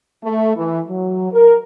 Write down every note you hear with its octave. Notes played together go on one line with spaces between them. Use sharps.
A3
E3
F#3
A#4